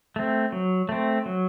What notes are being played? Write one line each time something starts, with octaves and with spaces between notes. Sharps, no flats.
A3 C4
F#3
A3 C4
F#3